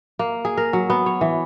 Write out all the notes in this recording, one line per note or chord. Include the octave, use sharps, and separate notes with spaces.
A#3
G#4
A#4
F#3
B3
C#5
E3